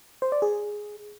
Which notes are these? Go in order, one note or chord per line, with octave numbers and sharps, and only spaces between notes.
C5
D5
G#4